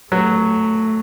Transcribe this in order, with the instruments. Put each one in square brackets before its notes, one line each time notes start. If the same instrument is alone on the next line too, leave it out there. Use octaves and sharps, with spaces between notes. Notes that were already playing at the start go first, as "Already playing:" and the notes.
[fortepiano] F#3 [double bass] A3